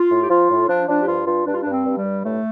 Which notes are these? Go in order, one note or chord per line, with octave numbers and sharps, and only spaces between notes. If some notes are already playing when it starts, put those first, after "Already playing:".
Already playing: F4
A2
G4
F3 F4
A2
F3 D4
F3 D4
G4
G2 F4
G2 F4
G2 D4
F4
G2 D4
C4
G2
G3
G2
A2 A3